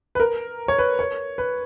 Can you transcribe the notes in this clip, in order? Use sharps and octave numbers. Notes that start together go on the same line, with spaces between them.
B4
A#4
C#5
B4
C#5
B4